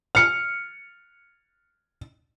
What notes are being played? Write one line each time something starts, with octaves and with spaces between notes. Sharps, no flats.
F6 C#7